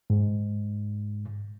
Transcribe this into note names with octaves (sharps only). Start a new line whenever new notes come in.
G#2